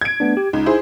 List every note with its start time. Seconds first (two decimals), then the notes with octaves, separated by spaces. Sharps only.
0.01 G#6 D7
0.20 A3 B3 D4
0.37 G4
0.53 C#2 D#4
0.66 E4 G#4 C5